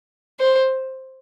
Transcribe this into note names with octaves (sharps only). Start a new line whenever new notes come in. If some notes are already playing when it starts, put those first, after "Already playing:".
C5